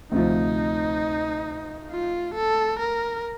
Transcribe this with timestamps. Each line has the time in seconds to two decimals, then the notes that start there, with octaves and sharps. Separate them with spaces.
0.12 D2 C3 F3 D#4
1.91 F4
2.35 A4
2.80 A#4